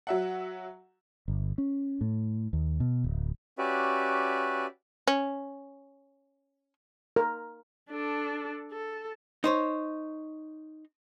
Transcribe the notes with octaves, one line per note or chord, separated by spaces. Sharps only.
F#3 E5 F#5
G1
C#4
A2
D#2
B2
D1
C#4 F#4 G4 B4 D5 E5
C#4
A#4
D4 A4
A4
D#4 C5 C#5